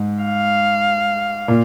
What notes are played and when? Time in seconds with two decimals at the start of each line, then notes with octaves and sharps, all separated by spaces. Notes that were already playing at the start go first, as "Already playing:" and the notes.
Already playing: G#2
0.24 F5
1.48 A#2